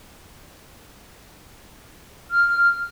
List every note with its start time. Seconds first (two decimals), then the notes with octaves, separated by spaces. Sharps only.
2.30 F6